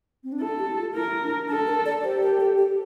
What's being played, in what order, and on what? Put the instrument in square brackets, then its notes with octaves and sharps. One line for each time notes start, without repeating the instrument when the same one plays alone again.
[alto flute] C4
D4
[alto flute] E4 [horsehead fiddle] A4
[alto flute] G4
F4
[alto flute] E4 [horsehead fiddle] A#4
[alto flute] D4
[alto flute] D4 [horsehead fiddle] A4
[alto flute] A#4
D5
[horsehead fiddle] G4 [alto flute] C5
[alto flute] A#4
A4
G4